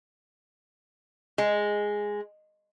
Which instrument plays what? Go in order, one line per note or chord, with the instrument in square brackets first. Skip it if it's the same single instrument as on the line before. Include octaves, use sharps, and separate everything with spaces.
[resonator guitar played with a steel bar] G#3